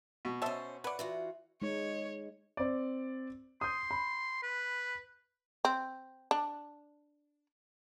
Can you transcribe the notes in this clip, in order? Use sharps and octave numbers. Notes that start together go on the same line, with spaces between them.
B2
C#4 C5 D#5 E5 A5
B4 D5 F#5
E3 F4 F#4
G#3 D#4 C#5
C4 D5
C6 D#6 G6
B5
B4
C4
D4